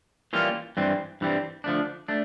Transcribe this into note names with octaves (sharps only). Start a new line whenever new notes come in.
E3 G3 A#3 C#4 F4
G2 E3 G3 C4
G2 E3 G3 C4
D3 F3 A3 D4
A3 D4